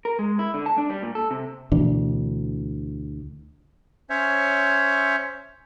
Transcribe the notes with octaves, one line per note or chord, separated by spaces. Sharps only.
A#4
G#3
E4
D3
A5
D4
G3
A#2
A4
C3
D2 B2 E3 D4
C#4 C5 C#5 E5